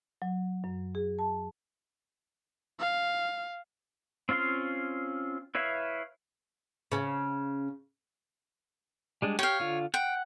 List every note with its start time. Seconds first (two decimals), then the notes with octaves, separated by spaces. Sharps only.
0.22 F#3
0.64 F#2
0.95 G#4
1.19 A5
2.79 F5
4.29 C4 C#4 F4 F5 C6
5.55 E4 B4 C#5 E5 F5
6.92 C#3 C#4
9.22 G3 G#3 D4
9.39 G4 C#5 F5 G5
9.60 D3 F4
9.94 F#5 G5